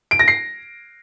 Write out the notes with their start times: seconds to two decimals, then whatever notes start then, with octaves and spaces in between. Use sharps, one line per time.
0.11 D7
0.19 A#6
0.28 C7